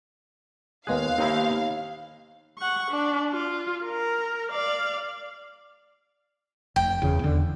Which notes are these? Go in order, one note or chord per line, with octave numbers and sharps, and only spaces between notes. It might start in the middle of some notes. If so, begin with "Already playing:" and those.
D#2 G#3 B3 G#4 F5 F#6
D#2 C4 D#4 E4
F#5 C#6
D4
F4
A#4
D5 F5
F1 G5
E2 C#3
E2 D3